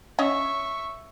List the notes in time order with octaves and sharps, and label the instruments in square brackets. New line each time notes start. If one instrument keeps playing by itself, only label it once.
[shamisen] C#4 C#5 D#5 [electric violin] E5 C#6